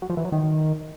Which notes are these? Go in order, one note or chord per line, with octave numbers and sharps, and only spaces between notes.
F#3
F3
E3
F#3
D#3